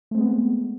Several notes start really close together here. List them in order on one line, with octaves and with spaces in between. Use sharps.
A3 C4 G#3 B3